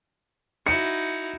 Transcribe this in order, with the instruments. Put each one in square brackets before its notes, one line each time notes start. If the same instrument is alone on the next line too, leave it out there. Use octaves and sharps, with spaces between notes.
[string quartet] D#4 E4 F#4 [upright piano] C#7